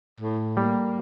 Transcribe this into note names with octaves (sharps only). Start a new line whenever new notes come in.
A2
G3 A#3